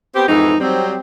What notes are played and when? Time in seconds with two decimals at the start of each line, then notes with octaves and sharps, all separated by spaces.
0.15 B3 C4 G4
0.28 F2 G#2 E3 D#4
0.60 F#3 G3 C4